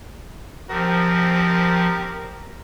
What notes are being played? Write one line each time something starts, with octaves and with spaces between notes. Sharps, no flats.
F3 C4 G4 A#4